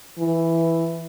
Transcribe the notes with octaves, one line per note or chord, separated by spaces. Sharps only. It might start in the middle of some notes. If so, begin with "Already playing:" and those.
E3